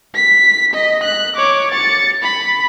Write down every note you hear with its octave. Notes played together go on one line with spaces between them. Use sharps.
B6
D#5
F#6
C#5 D6
A6 C#7
B5